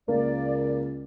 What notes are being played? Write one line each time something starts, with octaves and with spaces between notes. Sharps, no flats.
C#2 A#3 D5